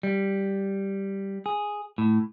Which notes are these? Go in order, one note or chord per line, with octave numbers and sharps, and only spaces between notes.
G3
G#4
A2